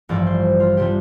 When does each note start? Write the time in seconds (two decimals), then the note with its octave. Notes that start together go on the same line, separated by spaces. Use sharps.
0.09 A1 G2 F3 A3 D5
0.27 C5
0.60 F4
0.77 C3 G3 D4 G4